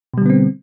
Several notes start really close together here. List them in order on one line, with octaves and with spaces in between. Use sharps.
B2 G3 D3 B3 C4